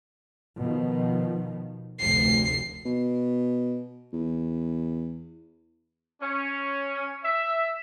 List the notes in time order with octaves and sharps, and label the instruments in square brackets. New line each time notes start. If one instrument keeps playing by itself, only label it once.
[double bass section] B2 D#3 F3
[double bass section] F1 D2 [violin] C7
[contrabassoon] B2
E2
[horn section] C#4
E5